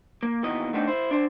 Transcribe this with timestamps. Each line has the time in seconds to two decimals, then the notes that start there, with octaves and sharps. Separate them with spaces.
0.23 A#3
0.43 D#2 B2 E3 B3 D#4 D#5
0.73 A3 B3 C4 D4 D#4
0.87 E4 C5
1.11 D4 C5